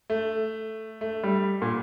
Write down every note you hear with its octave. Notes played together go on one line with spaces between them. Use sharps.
A3
A3
G3
A#2